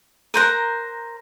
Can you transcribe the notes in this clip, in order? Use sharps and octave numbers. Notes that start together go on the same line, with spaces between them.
A#4 C5 A#5 F#6 G6 D#7